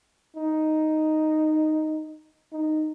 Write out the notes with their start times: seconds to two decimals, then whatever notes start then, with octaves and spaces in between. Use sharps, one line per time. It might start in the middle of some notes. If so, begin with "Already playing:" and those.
0.37 D#4
2.53 D#4